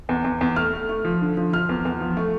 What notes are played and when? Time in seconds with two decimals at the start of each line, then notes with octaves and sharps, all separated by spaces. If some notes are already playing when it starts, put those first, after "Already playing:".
0.09 E2
0.24 E2
0.41 E2
0.56 A3 F6
0.73 A3
0.89 A3
1.05 F3
1.22 D3
1.37 F3
1.53 F3 F6
1.69 E2
1.85 E2
2.01 F3
2.17 A3